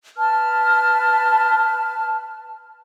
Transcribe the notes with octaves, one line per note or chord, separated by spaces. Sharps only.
B4 A5 F6